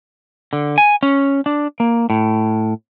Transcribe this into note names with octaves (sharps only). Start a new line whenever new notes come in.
D3
G#5
C#4
D4
A#3
A2